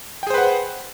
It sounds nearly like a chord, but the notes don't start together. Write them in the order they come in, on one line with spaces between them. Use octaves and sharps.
G5 G#4 C5 B4 F#5